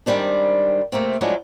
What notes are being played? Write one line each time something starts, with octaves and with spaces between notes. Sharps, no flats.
G#2 D#3 E3 G3 C4 D4
C3 A3 A#3 C4
F3 F#3 G#3 A3 D4 E4